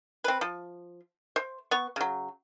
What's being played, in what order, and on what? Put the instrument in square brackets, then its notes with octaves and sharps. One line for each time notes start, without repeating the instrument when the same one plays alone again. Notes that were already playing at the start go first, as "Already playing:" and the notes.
[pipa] C4 B4
F3
C5
B3 C#6
C#3 F#3